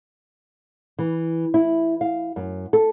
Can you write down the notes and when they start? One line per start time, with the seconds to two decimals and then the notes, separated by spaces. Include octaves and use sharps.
0.99 E3
1.54 E4
2.01 F5
2.36 F#2
2.73 A4